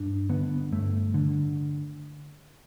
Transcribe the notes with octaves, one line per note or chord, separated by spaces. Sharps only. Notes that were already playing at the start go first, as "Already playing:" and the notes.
Already playing: G2 D4
D3 B3
G2 A3
D3